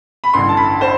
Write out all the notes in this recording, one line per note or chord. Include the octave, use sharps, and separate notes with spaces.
B5
A1 G2 D3 C6
A5
B5
C5